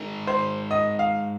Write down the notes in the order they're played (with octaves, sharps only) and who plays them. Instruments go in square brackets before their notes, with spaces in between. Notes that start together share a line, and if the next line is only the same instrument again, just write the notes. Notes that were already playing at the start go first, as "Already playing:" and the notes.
Already playing: [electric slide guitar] G#3 D#4 A#4
[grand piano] C5
D#5
F5